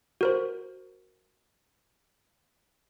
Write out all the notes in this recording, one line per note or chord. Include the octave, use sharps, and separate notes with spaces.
F#4 A#4 C5